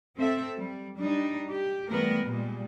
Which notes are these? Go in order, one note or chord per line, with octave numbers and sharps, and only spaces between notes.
C4 A4 E5
G3
G3 D4 D#4
G4
E3 G3 A3 B3 A#4
A#2 G3 G#3